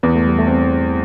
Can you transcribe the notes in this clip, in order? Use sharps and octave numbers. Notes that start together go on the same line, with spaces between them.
E2 B3
A3
G3
A3
C4